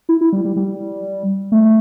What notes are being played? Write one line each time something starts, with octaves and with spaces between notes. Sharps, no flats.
E4
E4
G3
G3
G3
A3